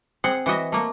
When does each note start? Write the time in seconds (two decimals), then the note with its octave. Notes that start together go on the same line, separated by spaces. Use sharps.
0.24 C4 G#4 F#5
0.46 E3 F#4 D#5 E5
0.72 A3 A#3